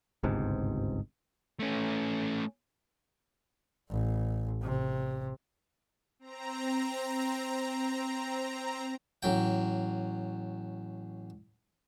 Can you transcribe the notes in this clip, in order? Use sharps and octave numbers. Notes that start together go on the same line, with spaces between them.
G1 C#2 G#2 C3
A3 C#4
A1
C3
C4 A#5
A1 F#3 G5